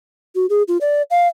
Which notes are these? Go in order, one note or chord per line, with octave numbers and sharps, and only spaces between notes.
F#4
G#4
F4
D5
F5